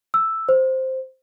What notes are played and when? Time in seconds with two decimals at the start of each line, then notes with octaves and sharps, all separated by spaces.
0.14 E6
0.49 C5